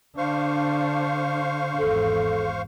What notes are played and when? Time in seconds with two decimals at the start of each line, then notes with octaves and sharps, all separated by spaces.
0.17 D3 D4 C5 F5 C#6
1.78 G#1 E2 A4